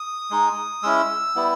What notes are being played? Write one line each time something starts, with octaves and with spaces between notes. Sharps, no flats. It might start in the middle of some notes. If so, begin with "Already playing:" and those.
Already playing: D#6
G#3 D#4
G#3 C#4 E4 E6
G3 B3 E4